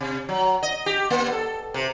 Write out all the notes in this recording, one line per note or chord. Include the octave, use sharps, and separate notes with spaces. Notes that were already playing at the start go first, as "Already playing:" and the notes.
C3
F#3
D#5
G4
A#3
A4
C3